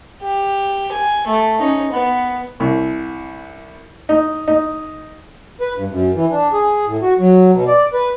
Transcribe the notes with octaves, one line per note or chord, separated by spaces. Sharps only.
G4
G#5
A3
C#4 D#4
B3
C2
D#4
D#4
B4
G2
F#2
E3
D4
G#4
A2
F#4
F#3
B2
D5
B4